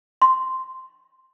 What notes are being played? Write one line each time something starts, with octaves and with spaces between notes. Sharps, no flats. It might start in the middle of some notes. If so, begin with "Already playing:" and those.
C6